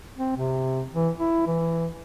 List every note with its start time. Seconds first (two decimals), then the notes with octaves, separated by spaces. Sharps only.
0.17 C4
0.36 C3
0.93 E3
1.18 E4
1.47 E3